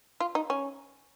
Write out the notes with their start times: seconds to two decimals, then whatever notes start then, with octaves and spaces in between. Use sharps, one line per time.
0.20 F4
0.35 D#4
0.50 C#4